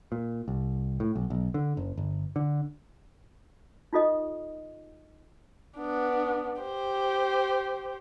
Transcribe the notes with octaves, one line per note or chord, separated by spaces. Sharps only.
A#2
C2
A2
B1
B1
D3
F#1
G1
D3
D#4 F4 A4 D#5 D#6
B3 D4
G4 C5